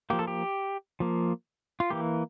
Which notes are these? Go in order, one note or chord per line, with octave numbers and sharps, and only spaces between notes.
F3 A#3 G4
A4
G4
F3 A#3
F4
E3 A#3 G4